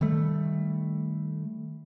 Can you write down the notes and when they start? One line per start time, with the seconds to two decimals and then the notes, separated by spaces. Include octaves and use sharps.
0.01 D#3 G3 A3